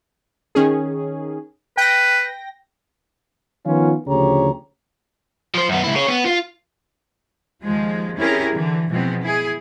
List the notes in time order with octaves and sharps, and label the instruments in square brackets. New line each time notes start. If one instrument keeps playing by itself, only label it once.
[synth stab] D#3 C#4 G#4
[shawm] B4 [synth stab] G5 A#6
[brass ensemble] D#3 F3 B3 C#4 F4
D2 C#3 F3 G4 C#5 A#5
[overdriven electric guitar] F3 C5
F#2 B3
C#2 E4
G#4 C#5
B3
F4
[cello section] D#2 F3 G#3
C4 C#4 E4 G4 G#4 A#4
D3 E3
B2 E3 F3 G#3 B3 C4
E4 G#4